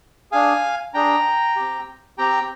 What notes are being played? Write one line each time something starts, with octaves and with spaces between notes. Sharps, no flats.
D4 G#4 F5 G#5
D4 G#4 G5 A#5
C4 G4
C4 G4 G5 A#5